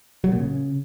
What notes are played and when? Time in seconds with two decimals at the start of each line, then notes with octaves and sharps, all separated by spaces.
0.24 F#3
0.32 A#2
0.40 C#3